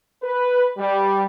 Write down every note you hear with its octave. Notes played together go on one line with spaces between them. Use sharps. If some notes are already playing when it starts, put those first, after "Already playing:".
B4
G3